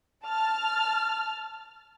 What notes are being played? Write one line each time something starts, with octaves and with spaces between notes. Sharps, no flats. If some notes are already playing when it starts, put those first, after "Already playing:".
A5 F6